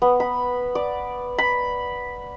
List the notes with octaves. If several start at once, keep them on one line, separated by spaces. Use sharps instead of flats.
B3
B5
D5
B5